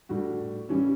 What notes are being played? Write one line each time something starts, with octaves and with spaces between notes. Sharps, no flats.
A2 G3 D4 F#4
C#3 E3 G3 C#4